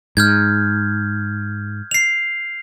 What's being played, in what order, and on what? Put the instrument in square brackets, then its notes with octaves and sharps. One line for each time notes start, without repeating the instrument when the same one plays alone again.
[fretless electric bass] G#2 [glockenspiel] F6 G6 G#6
[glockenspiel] C7 F7